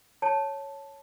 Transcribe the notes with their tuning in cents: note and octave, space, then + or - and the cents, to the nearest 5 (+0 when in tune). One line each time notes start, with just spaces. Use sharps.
C#5 +0 A5 -5